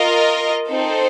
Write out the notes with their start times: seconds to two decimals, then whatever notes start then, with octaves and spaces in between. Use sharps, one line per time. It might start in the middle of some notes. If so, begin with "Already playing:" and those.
Already playing: F4 A#4 D#5
0.69 C4 D#4 A4 C5